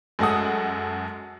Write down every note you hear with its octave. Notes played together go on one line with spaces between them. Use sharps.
F#2 G#3 A4 F#5 D#6